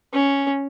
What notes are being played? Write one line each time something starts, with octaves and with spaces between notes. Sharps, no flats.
C#4